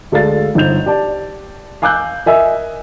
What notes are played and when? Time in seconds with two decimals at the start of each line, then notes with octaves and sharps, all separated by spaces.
0.12 D2 G#3 A4 D5 F5 A6
0.55 G1 D#4 C5 G6 F7
0.86 G4 D5 A5
1.82 F5 G#5 D6 E6 F#6 G6
2.26 A#4 D#5 E5 G#5 E6